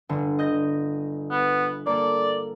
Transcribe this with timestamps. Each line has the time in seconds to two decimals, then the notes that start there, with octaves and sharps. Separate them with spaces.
0.09 G1 D3
0.39 D#5 G6 A#6
1.31 B3
1.86 A#3 A4 D5